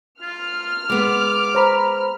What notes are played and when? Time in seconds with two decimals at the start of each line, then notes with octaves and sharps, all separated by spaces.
0.22 F4 F6
0.90 G#3 B3 D6
1.55 C5 A#5 B5